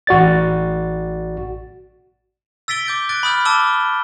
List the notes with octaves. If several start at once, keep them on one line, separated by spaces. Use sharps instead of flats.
A1 F#4 D5 A6
E6 A6 B6 D7 G7
D6 G6 A6 D7
F#6 G6 A6 D7
B5 D#6 F6 G6
A5 D6 E6 G7